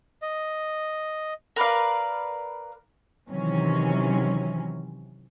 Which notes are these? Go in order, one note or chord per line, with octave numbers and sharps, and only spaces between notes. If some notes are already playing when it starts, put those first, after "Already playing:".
D#5
A#4 B4 D5 F5
C3 D#3 E3 F#3 C#4